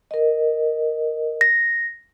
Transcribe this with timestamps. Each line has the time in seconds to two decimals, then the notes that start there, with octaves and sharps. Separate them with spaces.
0.11 A#4 D#5
1.41 A#6